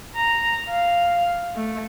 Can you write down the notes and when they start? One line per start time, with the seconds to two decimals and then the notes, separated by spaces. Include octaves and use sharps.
0.16 A#5
0.69 F5
1.56 A3